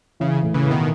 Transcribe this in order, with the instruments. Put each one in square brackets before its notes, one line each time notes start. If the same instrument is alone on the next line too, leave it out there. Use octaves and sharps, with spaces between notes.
[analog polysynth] C#3 [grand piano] E3
[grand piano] A2
[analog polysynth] C#3 E3
[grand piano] A2
[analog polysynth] B2 D#3